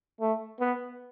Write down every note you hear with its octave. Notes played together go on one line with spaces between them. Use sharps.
A3
B3